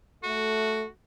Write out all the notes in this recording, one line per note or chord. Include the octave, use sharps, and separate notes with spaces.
A3 F#4